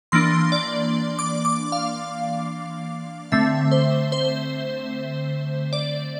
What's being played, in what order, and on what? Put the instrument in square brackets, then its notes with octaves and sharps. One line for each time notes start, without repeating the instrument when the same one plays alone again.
[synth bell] E3 A#3 D4 C6
D5
D6
D6
F5
D3 A3 C4 E5
C5
C5
D5